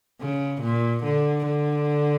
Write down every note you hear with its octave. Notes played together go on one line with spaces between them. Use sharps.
C#3
A#2
D3
D3